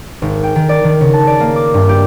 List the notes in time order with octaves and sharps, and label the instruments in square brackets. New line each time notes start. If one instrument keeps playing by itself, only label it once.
[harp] G#1
G5
D#3
D5
D#3
C#3
A5
D5
A#3
D6
G2
G4